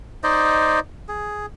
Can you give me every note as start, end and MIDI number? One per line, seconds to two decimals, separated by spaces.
0.23 0.80 63
0.23 0.80 72
0.23 0.80 74
0.23 0.80 75
1.08 1.46 68